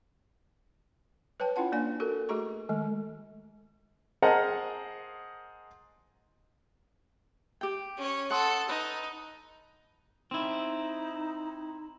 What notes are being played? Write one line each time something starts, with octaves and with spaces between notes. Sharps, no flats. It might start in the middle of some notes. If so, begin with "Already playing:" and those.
B4 C#5 G5 A5
C#4 E4 F4 F#5 A5
A#3 D4 D5 G#5
F#4 A4 A#4
A3 F#4 G#4 A#5 C#6
D#3 G#3 A3
G#4 A#4 C5 D#5 F#5 A5
G4 G5
C#4 C#5
A4 F#5 A5 C6 D#6
D#4 B4
C4 D#4 E4